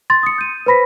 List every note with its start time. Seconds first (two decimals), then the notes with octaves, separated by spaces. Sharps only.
0.10 C6 A6
0.23 D#6 C#7
0.38 G6 D#7
0.66 B4 C5 B5 A#6 B6